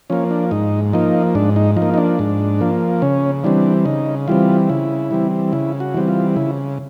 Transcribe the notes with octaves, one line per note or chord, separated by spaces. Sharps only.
F3 A#3 C#4
D4
G#2 D#4
F3 A#3 D#4
G#2 D4
D#4
F3 D#4
A#3
D#4
D4
G#2
F3 A#3
C#3 C#4
E3 G3 C4 D4
C#3 D#4
E3 G3 C4 F4
C#3 E4
E3 G3 C4
C#3 E4
F#4
E3 G3 C4
F4
C#3 E4